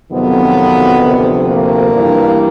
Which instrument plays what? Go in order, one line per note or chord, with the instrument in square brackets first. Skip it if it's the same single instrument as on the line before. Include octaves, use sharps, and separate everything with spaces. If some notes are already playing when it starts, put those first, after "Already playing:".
[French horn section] F2 C3 D#3 F#3 B3
D2 C3 F3
A#3
G2 E3